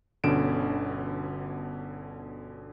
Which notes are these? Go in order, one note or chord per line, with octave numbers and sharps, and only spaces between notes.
G1 B2 D3 C#4 D7 E7